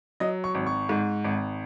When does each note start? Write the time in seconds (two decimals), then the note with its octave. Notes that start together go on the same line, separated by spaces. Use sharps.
0.20 F#3 D#5
0.44 C#6
0.55 G#1
0.66 C#6
0.89 G#2
1.24 G#1